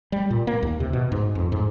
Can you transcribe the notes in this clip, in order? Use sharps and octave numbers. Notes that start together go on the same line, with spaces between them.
G3
A#2
A#3
D#2
C3
B2
G#2
F2
G#2